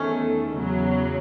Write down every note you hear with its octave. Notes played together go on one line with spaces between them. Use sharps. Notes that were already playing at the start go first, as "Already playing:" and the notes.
Already playing: E2 D#3 A3 C#4
E2 C#3 F#3